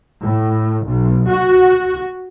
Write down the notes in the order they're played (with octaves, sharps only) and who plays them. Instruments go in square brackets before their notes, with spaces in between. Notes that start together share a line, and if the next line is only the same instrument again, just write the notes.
[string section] A2
B1
F#4